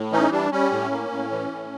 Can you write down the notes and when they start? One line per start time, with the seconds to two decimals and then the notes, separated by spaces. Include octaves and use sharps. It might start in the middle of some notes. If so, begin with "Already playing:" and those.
Already playing: A2
0.12 E3 C#4 D#4
0.32 G3 D4
0.52 G3 C#4
0.72 A2
0.92 A#3
1.11 A2
1.32 E3
1.51 A2